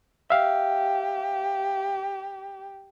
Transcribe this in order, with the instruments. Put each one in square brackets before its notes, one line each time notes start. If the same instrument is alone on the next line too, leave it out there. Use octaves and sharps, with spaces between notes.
[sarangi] G4 [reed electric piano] E5 F5